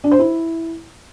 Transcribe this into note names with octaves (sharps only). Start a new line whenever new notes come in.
D4
C5
E4